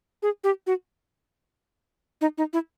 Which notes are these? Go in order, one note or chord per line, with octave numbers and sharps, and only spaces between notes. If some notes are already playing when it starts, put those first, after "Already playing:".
G#4
G4
F#4
D#4
D#4
E4